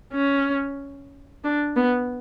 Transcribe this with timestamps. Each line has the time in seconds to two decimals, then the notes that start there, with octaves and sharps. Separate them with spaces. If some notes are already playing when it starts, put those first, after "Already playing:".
0.13 C#4
1.44 D4
1.76 B3